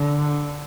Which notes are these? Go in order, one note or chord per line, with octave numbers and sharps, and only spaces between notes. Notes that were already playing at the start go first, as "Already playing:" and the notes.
Already playing: D3